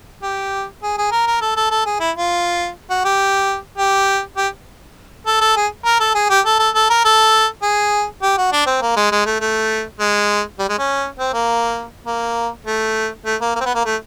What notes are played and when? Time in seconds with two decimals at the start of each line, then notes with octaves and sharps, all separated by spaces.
0.23 G4
0.83 G#4
0.98 G#4
1.12 A#4
1.27 A#4
1.41 A4
1.56 A4
1.71 A4
1.86 G#4
2.00 E4
2.16 F4
2.90 F#4
3.05 G4
3.78 G4
4.37 G4
5.27 A4
5.41 A4
5.57 G#4
5.85 A#4
6.00 A4
6.15 G#4
6.30 G4
6.45 A4
6.59 A4
6.75 A4
6.90 A#4
7.05 A4
7.63 G#4
8.22 G4
8.38 F#4
8.53 D4
8.67 C4
8.82 A#3
8.97 G#3
9.12 G#3
9.26 A3
9.41 A3
10.00 G#3
10.59 G3
10.69 G#3
10.79 C#4
11.19 C4
11.33 A#3
12.07 A#3
12.67 A3
13.25 A3
13.41 A#3
13.55 A#3
13.61 C4
13.66 B3
13.75 A#3
13.85 A3